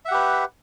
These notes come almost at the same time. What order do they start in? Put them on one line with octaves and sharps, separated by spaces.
E5 F#5 G4 B4